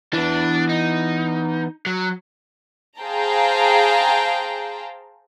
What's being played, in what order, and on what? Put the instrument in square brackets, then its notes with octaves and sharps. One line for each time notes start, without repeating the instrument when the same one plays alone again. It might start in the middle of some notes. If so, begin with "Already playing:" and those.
[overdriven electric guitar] E3 B3 [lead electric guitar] D4
[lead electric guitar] D#4
F#3
[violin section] G#4 C5 F5 G5 A5 A#5